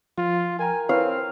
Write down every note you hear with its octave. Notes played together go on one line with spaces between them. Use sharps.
F3 F4
A#4 G5 G#5 A#5
C4 E4 B4 C#5 F5